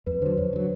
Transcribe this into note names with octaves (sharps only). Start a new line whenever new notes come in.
F2 B4
D3 F#3 C5
F2 C#5
D3 F#3